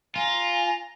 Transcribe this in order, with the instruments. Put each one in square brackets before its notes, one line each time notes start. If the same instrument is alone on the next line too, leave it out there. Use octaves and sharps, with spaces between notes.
[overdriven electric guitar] F4 [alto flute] G#5 [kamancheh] A#5